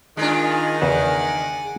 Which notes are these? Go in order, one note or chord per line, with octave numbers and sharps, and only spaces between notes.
D#3 G#3 D4 F4 G#5
E2 C#3 E5 F#5 G#5 D6